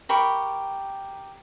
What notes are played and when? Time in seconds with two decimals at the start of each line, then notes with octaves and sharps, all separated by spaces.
0.09 G4 A#4 B5 C#6